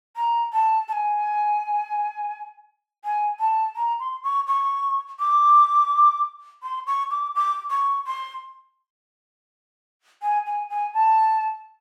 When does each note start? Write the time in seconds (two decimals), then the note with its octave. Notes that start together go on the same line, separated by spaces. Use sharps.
0.16 A#5
0.53 A5
0.88 A5
0.93 G#5
3.04 G#5
3.39 A5
3.76 A#5
4.00 C6
4.24 C#6
4.47 C#6
5.19 D6
6.63 C6
6.87 C#6
7.11 D6
7.35 D6
7.70 C#6
8.07 C6
10.22 G#5
10.46 G#5
10.70 G#5
10.94 A5